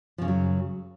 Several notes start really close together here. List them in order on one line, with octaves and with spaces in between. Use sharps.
F3 C#3 F#2 F#3